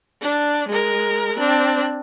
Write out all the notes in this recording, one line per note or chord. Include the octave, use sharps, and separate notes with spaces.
D4
G#3 A#4
C4 D4